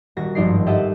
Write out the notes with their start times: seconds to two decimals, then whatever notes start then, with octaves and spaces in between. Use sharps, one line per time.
0.17 D#1 F#4 A#6
0.35 G#1 G2 F3 D#4 D5 C7
0.66 G4 A4 D#5 E5 F#5 A5